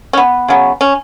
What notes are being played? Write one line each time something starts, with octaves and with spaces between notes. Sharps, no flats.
C#4
B3
C#3 F#3 B3
C#4